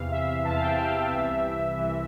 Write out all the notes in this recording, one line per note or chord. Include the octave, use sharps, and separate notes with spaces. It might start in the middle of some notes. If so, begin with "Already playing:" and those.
Already playing: E2 C3 E3 F5
E5
E2 C3 E3 A5
F5
G5
F5
F5
C2 C3 E3 E5
C2 C3 E3